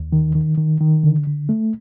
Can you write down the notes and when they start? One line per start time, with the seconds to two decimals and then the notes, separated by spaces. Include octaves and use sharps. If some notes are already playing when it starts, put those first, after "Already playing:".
Already playing: D#2
0.12 D#3
0.35 D#3
0.58 D#3
0.80 D#3
1.04 D3
1.27 D3
1.49 A3